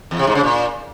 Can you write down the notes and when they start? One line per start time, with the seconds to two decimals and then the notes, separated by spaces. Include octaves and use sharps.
0.11 E2
0.19 C3
0.27 G#2
0.35 C#3
0.43 A#2